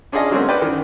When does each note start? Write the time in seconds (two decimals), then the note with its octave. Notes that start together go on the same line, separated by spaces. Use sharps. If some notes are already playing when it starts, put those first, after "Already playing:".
0.12 C#4 D4 F4 G#4 D5 D#5
0.30 D3 F#3 G#3 A#3 C4 C#4
0.48 B4 C5 D5 G5
0.61 F#2 D#3